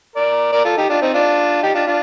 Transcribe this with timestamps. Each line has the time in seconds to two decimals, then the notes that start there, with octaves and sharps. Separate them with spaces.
0.16 A#4 D5
0.53 A#4 D5
0.65 F4 A4
0.78 D#4 G4
0.90 D4 F4
1.02 C4 D#4
1.14 D4 F4
1.63 D#4 G4
1.74 D4 F4
1.87 D4 F4